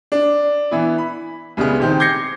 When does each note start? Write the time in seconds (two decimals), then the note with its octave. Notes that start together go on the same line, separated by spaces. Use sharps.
0.12 D4
0.71 E3 B3 E4
0.98 B5
1.57 C2 C#3 G3 G#3 B3
1.80 C3 D#3 C5
2.00 D6 G6 G#6 A#6 C7 C#7